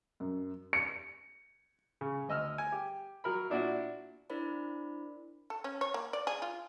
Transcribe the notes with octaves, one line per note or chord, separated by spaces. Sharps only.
F#2
C#7
C#3
D2 D#5 E6 F6
G#5
G4
F#3 A#4 B5
A#2 D4 E4 F#4
D4 E4 A#4 C5 D5 B5
A4
C#4
C#5
A#3
D5
G#4
F4